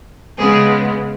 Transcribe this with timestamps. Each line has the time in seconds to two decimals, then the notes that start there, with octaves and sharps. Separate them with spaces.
0.38 C#3 G#3 B3 G#4